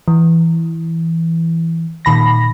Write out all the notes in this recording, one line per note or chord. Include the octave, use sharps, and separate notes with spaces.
E3
A#2 D#3 B5 A#6